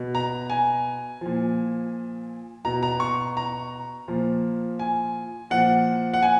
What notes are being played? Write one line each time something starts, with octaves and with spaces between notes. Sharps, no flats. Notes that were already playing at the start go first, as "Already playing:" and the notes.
Already playing: B2
A#5
G#5
A#2 F3
B2 A#5
A#5
C#6
A#5
A#2 F3
G#5
A#2 F3 F#5
F#5
G#5